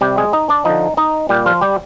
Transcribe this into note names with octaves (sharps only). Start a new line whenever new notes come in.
C3 G3 G4
G#3 G#4
D#4 D#5
D4 D5
D3 F3 D#4 D#5
D#4 D#5
A#2 G3 G4
F3 F4
G3 G4